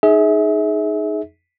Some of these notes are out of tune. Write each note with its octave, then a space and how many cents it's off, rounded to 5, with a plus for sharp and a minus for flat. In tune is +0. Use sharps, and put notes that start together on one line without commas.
D#4 +0 G#4 +15 E5 -30